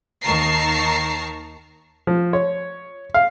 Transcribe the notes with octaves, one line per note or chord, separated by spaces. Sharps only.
D#2 D#3 A5 A#5 C#6 C7
F3
C#5
F5